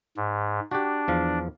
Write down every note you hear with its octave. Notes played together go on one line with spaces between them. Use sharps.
G#2
D4 F#4 G4
E2 F3 F5